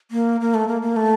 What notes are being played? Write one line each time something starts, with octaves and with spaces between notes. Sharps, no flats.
A#3
A#3
A3
A#3
A#3
A3